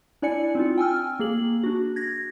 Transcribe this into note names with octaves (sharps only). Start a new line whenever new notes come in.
D4 E4 D5 G#5 C#7
C4 D#4 F4
G5 G#5 E6 F6
A#3 G#4 F#7
D4 F#4
G#6 A#6